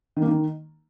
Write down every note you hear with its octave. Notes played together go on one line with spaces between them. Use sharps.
D#3
A#3
D#3